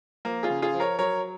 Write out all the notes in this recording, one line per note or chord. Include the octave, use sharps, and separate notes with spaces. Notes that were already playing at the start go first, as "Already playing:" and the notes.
F3 A#3
F4 G#4
C#3
F4 G#4
F3
A#4 C#5
F#3 A#4 C#5